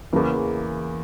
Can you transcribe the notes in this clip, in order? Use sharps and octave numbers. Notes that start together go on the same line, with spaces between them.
E2 C#3 E3 A#3